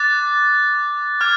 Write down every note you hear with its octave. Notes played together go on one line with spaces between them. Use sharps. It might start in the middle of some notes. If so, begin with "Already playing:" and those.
Already playing: D6 F#6 A6
D6 F6 G#6